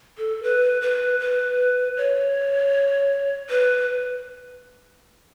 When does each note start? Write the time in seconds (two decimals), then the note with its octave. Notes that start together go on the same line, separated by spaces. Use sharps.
0.18 A4
0.43 B4
0.82 B4
1.20 B4
1.97 C#5
3.49 B4